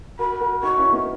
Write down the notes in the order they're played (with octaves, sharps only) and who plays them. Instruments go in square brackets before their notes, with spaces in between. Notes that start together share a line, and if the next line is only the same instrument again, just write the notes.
[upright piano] F#4 A#4 [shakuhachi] B5
[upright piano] F#4 A#4
[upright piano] D#4 F#4 [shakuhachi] C#6
[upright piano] C#4 E4
B3 D#4